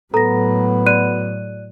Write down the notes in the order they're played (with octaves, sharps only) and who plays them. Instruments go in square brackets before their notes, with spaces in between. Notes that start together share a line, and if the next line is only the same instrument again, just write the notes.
[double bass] A2 F#3 [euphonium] B3 [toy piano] A4 [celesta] A#5 A#6
[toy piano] F#4 [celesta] D5 F#6 D#7